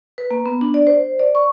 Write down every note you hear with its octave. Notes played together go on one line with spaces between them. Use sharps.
B4
A#3
B3
D4
D5
C5
D5
C#6